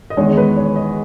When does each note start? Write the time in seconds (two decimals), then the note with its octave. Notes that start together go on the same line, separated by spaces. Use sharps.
0.10 D#5
0.17 E2 D#3 G#3 C#5
0.37 B4
0.57 C#5
0.76 D#5